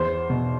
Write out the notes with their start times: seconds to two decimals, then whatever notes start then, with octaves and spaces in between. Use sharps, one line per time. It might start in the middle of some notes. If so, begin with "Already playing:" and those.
Already playing: E2 C5
0.30 B2